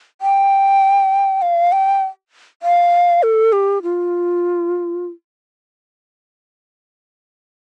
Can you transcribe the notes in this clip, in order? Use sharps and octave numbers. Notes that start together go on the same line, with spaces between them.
G5
F5
G5
F5
A4
G4
F4